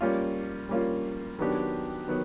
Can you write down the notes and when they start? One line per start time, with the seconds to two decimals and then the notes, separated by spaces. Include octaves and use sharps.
0.01 G3 A#3 C#4 F4
0.69 G3 A#3 C#4 F4
1.39 D#3 F#3 B3 D4 G4
2.08 D#3 F#3 B3